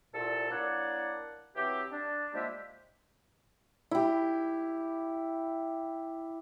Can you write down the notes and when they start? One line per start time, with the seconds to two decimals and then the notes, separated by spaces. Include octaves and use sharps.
0.14 C2 A#2 A4
0.50 A#3 D4 E4 C#5 F#5 A5
1.56 E3 F#3 C4 G4
1.92 D4
2.33 F3 G3 G#3 A#3 G4 E5
3.91 E4 G4